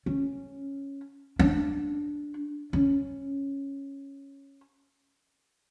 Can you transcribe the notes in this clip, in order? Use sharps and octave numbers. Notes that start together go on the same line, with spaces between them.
C#4
D4
C#4